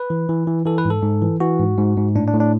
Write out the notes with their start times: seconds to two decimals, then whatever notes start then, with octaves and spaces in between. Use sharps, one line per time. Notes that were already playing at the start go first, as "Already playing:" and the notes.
Already playing: B4
0.10 E3
0.29 E3
0.47 E3
0.66 E3 A4
0.78 B4
0.85 G#2
0.90 A4
1.03 G#2
1.22 E3
1.40 E3 F#4
1.59 G#2
1.78 G#2
1.97 G#2
2.15 A2 D4
2.27 D4
2.34 A2
2.40 D4